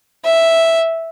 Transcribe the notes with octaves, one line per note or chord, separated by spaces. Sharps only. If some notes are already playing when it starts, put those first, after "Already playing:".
E5